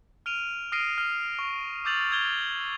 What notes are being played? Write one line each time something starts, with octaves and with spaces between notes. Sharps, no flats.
F6 D7 D#7 F7
D#6 F6 A#6 C7 D7 D#7
F6
C#6
D6 E6 G6 A6 F7 F#7
E6 G6 G#6 F7 G7